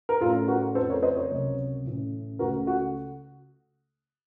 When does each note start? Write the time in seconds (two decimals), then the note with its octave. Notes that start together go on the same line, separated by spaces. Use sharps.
0.09 A#4
0.21 A2 A3 C#4 F4 A4
0.48 F#4 A#4
0.75 F2 C#3 A3 A4 C5
0.90 A#4 C#5
1.03 C5 D#5
1.17 A#4 C#5
1.31 C#2 C3 F#3
1.85 A1 A2 A3 C#4
2.39 C#2 C#3 A3 F#4 A#4
2.67 F#4